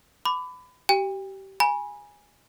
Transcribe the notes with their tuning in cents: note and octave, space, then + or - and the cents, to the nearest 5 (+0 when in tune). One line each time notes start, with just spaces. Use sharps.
B5 +25 D6 +0
G4 -25 G5 +40
G#5 -10 B5 -30